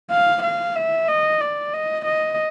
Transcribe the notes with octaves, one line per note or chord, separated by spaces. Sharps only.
F5
F5
E5
D#5
D5
D#5
D#5